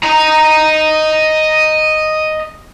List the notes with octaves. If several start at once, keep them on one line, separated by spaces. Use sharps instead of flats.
D#5 A#5